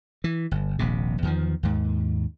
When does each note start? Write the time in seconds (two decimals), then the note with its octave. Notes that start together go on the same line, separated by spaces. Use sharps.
0.24 E3
0.51 G1
0.79 D#1 A#1 C3
1.23 E2 D#3 F3
1.63 D#2 G#2